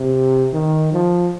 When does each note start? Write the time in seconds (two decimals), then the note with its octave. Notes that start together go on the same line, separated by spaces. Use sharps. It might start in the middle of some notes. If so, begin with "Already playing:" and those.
Already playing: C3
0.54 D#3
0.93 F3